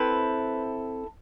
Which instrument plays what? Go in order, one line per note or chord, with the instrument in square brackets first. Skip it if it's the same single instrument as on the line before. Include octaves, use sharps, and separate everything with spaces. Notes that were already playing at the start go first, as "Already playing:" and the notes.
Already playing: [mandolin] C4 E4 A4 B4